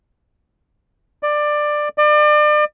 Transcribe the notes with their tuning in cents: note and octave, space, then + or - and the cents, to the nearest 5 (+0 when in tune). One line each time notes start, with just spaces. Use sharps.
D5 +15
D5 +35